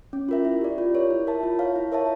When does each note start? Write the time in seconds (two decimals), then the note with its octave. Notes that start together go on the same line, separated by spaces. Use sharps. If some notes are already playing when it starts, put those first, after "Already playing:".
0.13 C#4
0.29 F4 A#4 E5
0.45 E4
0.61 G4 D5
0.78 F4
0.94 A#4 C#5
1.10 E4
1.27 A#4 E5 A5
1.43 F4
1.59 C#5 F5
1.76 E4
1.92 A#4 C#5 E5 A5